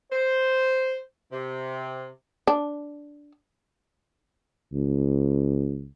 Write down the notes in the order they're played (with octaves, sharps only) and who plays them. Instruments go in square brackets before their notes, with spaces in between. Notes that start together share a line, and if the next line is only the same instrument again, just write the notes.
[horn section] C5
C3
[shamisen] D4
[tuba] C#2